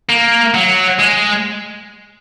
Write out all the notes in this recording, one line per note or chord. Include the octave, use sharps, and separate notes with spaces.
A#3
F#3
G#3